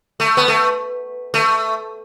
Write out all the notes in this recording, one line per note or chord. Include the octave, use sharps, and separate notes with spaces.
A3
B3
A3
A3